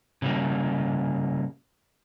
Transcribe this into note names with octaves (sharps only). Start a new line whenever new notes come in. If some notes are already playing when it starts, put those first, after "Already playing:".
C#3 G3 A#3